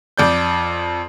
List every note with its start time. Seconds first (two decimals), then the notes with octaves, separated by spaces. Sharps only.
0.17 F2 D5 G6